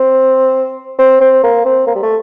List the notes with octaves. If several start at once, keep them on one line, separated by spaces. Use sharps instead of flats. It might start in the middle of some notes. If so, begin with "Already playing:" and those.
Already playing: C4
C4
C4
A#3
C4
A#3
G3
A3